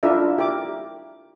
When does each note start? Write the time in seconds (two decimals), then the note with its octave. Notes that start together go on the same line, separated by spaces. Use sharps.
0.03 D4 E4 F4 A#4 D#5 E5
0.38 G4 A#4 E5 D6